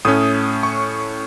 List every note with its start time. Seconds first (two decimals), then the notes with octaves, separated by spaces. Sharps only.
0.05 A2 A3 C#4 D#6
0.63 C#6